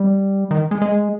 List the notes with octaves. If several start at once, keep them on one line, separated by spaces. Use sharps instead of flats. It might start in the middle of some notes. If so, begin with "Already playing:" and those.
Already playing: G3
D#3
G#3
G#3